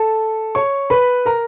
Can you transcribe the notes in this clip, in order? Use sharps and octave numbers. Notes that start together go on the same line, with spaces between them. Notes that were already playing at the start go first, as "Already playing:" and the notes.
Already playing: A4 A5
C#5 C#6
B4 B5
A#4 A#5